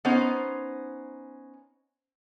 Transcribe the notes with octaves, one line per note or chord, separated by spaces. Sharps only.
B3 C#4 D#4 C5